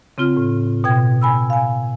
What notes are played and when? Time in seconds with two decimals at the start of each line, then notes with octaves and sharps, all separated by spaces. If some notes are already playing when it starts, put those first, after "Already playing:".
0.18 C#3 C4 F4 F6
0.37 A2
0.84 B2 G5 G#6
1.22 G#5 B5 E6
1.50 F5 G#5